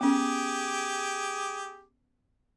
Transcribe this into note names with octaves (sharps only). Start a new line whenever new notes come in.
B3 C#4 G4 G#4 D6